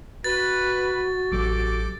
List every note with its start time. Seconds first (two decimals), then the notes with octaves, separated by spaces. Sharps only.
0.24 F#4 B4 A6
1.32 A1 F#3 G4 A4 D6